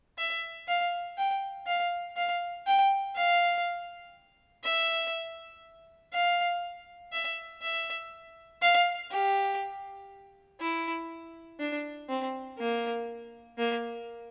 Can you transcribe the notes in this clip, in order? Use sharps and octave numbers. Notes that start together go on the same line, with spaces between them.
E5
F5
G5
F5
F5
G5
F5
E5
F5
E5
E5
F5
G4
E4
D4
C4
A#3
A#3